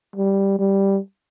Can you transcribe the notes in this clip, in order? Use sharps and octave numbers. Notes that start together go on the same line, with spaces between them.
G3
G3